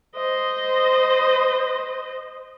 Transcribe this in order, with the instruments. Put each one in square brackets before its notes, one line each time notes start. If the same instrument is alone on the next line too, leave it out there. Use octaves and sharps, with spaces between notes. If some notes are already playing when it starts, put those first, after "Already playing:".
[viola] C5 D#5